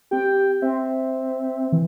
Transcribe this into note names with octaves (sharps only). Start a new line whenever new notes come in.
C4 G4 G5
C4 E5
E3